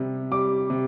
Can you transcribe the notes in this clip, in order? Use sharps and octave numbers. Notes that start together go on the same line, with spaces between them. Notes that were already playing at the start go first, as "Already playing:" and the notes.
Already playing: C3 G3
G3 D6
C3